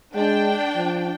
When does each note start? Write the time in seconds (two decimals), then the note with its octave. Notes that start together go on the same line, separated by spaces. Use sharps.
0.15 G#3 D4 G5
0.76 F3